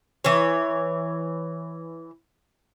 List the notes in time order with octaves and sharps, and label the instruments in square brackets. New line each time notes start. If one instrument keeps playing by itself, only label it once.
[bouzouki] E3 C#5